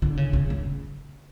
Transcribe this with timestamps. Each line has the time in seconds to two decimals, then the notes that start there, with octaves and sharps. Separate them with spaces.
0.02 D3
0.17 C#3
0.33 C#3
0.50 C#3